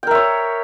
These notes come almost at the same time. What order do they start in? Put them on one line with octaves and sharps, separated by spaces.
G5 A#4 E5 C#5